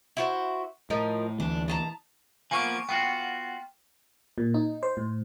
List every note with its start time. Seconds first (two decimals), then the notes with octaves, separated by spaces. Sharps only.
0.17 E4 F#4 C5
0.90 A2 F3 D#4 A#4
1.40 D2 E3 D4
1.68 B2 A5 A#5
2.51 F3 A#3 B3 G#5 C#6 F6
2.89 B3 F4 F#4 G5
4.38 A#2
4.54 D#4
4.83 C5
4.97 A2